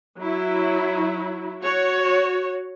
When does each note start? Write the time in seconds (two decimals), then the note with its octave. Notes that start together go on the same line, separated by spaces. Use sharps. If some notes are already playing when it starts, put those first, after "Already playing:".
0.18 F#3 E4
1.62 F#4 C#5